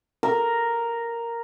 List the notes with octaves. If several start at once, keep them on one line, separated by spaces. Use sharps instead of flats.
A#4